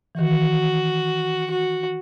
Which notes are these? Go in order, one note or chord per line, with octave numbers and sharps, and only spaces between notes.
E3
D#3 F#4
F#4